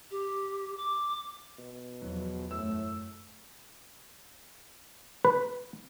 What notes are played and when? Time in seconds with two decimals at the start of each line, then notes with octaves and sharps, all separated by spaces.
0.11 G4
0.77 D6
1.59 B2
2.02 E2 F3 F#3
2.51 F#2 A2 A3 E6
5.25 B4